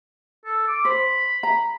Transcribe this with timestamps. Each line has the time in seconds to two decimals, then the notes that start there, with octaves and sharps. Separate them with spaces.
0.45 A4
0.68 D6
0.85 C5 B5
1.43 A#5